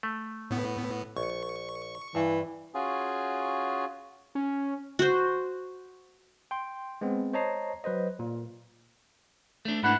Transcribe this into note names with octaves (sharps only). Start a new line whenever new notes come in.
A3
A2 B3
A#1 C#6
G2 E3
C#4 F4 F#4 G#4
C#4
F#4 C5
G5 C6
G#3 B3 C4
C5 C#5 D#5 A5 A#5 C7
F#3 B4 C5 D#5
A#2
A3 D4
G#2 E3 A3 D4 E4 F#5